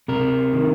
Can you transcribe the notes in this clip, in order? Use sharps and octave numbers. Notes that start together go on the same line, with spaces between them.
C3 A#4
D#3